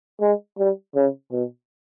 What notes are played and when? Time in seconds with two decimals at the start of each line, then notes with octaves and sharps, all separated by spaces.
0.21 G#3
0.58 G3
0.96 C#3
1.32 B2